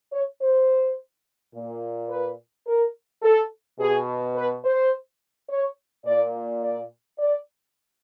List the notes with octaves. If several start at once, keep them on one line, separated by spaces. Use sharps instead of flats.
C#5
C5
A#2
B4
A#4
A4
B2 G#4
B4
C5
C#5
A#2 D5
D5
D5